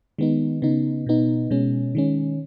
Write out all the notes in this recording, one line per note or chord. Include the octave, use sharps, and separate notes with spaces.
D#3 G#3 B3 D#4
C#3 B3 D#4
B2 B3 D#4
B2 G#3 C#4
D#3 G#3 C#4